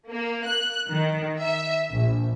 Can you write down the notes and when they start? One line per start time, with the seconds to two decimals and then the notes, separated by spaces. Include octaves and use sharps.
0.10 A#3
0.46 F#6
0.92 D#3
1.39 E5
1.92 A#1